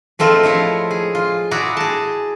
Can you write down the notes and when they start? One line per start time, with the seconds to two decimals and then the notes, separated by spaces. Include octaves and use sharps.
0.19 G#3 A3 C4 F4 A#4
0.43 F3 E4 F4 C#5
0.91 G#4
1.15 F4
1.51 E4 F#4 G#4 D5 A#5
1.77 G#4 A5